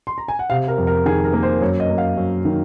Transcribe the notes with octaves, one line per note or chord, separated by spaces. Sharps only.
C6
A#5
G#5
F#5
C3 F5
A#4
F2
A#4
D#3 G#4
A#4
A#3
C5
F#2 C#5
D#5
A#3
F5
F#2
D#3